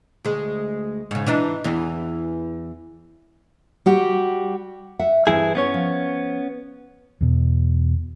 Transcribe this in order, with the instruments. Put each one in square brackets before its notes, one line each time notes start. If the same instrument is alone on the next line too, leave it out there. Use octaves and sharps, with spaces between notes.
[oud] D2 G#3
G#2 C#3
E3 D4 D#4
E2 E3
[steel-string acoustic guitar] G3 F#4 G4
[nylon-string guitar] E5 F#5
[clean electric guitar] G2 E4 G#4 [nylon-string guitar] E3 C4
[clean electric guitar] B3 C#4 C#5
[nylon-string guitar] F3
[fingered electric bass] E2 B2